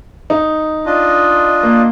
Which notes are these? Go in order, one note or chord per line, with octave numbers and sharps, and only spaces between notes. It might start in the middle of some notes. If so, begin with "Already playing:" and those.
D#4
D4 F4 D#5
A#3